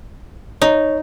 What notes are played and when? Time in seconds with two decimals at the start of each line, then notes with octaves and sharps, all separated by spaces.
0.62 D#4 C#5